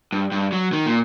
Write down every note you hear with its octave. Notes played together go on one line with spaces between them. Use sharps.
G2
G2
F#3
D#3
A#2